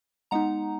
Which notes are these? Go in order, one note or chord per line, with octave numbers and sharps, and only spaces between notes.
G#3 B3 D#4 F#5 A#5